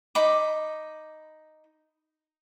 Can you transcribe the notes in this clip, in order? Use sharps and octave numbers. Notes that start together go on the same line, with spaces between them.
D#4 B5 D6